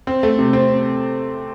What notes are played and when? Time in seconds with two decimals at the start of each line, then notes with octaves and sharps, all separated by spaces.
0.07 C4
0.23 A3
0.39 C3
0.53 C4